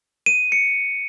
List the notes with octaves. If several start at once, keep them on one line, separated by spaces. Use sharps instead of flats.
D#7
C#7